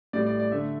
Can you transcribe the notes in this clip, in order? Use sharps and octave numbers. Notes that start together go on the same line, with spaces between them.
A2 G3 D5
D5
D5
D3 A3 E5